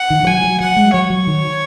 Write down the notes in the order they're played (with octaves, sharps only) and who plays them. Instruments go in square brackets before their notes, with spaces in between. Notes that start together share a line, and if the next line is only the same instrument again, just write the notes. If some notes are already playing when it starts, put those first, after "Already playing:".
Already playing: [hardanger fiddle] F#5
[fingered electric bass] D#3
D#3
[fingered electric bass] F#3 [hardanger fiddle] G#5
[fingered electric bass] F#3
[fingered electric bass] F#3 [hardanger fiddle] F#5
[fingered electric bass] G#3
[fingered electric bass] F#3 [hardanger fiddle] C#5
[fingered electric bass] F#3
D#3